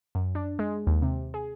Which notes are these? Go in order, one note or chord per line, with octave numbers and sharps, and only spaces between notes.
F#2
D4
G#3
D#2
C3
G#4